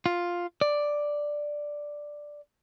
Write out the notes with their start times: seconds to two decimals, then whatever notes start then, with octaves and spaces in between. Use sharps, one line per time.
0.06 F4
0.61 D5